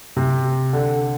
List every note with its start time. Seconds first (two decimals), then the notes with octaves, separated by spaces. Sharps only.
0.16 C3
0.73 D3